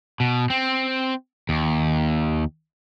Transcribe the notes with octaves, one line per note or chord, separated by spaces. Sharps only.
B2
C4
D#2